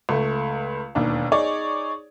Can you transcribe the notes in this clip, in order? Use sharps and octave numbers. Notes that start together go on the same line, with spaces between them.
C#2 A3
E1 D#2 D4
D#4 G#4 C#5 D5 C#6